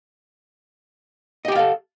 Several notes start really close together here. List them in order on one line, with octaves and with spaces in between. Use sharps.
D#5 G4 G5 F5 A4